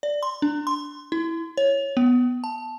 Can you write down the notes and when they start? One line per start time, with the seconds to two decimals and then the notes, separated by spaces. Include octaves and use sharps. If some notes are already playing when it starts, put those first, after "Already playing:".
0.03 D5
0.23 C6
0.42 D4
0.67 C6
1.12 E4
1.57 C#5
1.97 B3
2.44 A5